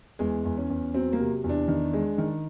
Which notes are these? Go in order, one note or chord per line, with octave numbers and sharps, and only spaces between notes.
E2 G#3
E2
C#4
E2
F#3 C4
A#3
C3
E2
D4
D#3
G#3
D#3